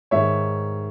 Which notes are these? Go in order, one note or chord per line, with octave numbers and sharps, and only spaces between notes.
G#2 D#3 C#5 E5